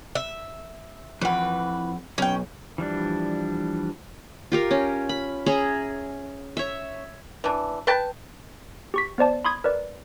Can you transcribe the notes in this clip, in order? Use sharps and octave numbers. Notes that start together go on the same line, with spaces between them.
E5
F2 E3 B4 F#5
B1 C#4 G5
E3 F3 G3 D4
F4 G4 A#4
C#4
B5
C#4 G#4 E5 A#5
C#5 E5
E3 D4
B4 G5 A5
G4 C#6 B6
B3 C5 D5 A5
B5 C6 D#6 G#6
A#4 B4 D5